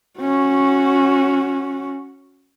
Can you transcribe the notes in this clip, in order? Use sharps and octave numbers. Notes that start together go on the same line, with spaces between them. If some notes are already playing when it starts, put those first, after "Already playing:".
C#4 F#4